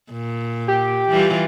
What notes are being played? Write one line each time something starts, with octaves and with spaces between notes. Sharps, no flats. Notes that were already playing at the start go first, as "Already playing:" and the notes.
A#2
G4
E3 G3 F4